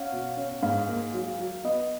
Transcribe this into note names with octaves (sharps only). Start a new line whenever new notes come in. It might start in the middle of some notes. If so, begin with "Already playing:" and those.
Already playing: C#4 F5 F#5
B2
C#4
G#2 F5
A#3
F#3
F#3
B3 D#5